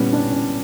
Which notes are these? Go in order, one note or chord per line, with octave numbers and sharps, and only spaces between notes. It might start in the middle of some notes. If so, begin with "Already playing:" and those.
Already playing: A#2 G3 B3 C#4
D4
C#4